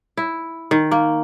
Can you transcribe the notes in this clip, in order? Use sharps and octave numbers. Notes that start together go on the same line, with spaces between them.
E4
D#3
A#3